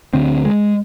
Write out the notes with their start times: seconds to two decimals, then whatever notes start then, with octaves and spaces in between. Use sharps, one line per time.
0.13 D2 D3 C4
0.45 G#3